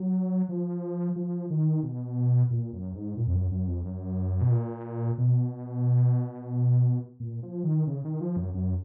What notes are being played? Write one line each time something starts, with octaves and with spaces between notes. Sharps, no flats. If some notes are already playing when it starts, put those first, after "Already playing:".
Already playing: F#3
F3
F3
D#3
B2
A#2
F#2
G#2
A#2
F2
F#2
F#2
F2
F#2
B2
A#2
B2
A#2
F3
D#3
C#3
D#3
F3
F#2
F#2